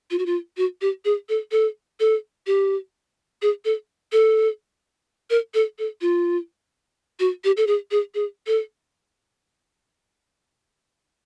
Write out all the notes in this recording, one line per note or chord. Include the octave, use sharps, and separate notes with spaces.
F4
F#4
F4
F#4
G4
G#4
A4
A4
A4
G4
G#4
A4
A4
A#4
A4
A4
F4
F#4
G4
A4
G#4
G#4
G#4
A4